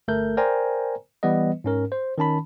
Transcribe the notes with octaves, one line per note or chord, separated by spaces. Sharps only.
G1 A3 A4 A#4 G6
A#4 C5 D5 G5 G#5 A#5
E3 G3 B3 B4 D#5
G#2 C#4 A#4
C5
D#3 C#4 A5 B5